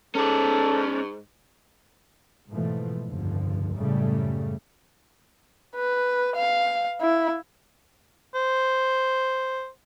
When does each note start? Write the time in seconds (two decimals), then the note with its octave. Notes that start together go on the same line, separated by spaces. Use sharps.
0.15 G#2 C#4 A4 D5
2.51 G#2 B2 E3 F3 A3
3.07 F1 C#2 G2 D3 F3
3.76 F#2 A2 C#3 G3 A3
5.75 B4
6.36 F5
7.00 E4
8.35 C5